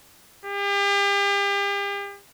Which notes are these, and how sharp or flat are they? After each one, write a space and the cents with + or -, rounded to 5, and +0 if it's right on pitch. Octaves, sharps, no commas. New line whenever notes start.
G4 +40